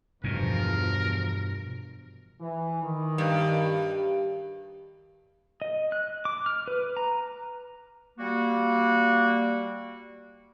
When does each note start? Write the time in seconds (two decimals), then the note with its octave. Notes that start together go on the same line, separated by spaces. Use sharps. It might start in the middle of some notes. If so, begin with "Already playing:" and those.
0.24 E2 G2 B2 F3 A#4
2.40 E3
2.84 D#3
3.18 G2
5.62 D#5
5.92 F#6
6.25 D6
6.46 F6
6.68 B4
6.97 A#5
8.19 G3 A#3 F#4